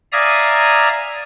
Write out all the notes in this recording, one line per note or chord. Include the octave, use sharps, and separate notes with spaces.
D5 E5 F5 G#5 A#5 D#6